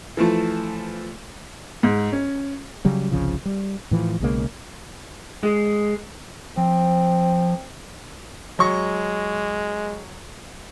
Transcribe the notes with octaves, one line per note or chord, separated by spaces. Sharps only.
E3 F3 A3
G#2
C#4
C#3 F#3 G3
G1 C2 C#3 F3
G3
A2 E3 F3
B1 C#3 G#3 A#3
G#3
F3 C4
F#3 G#3 C#6 A#6